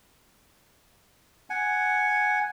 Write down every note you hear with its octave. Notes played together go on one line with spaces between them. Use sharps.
F#5 G#5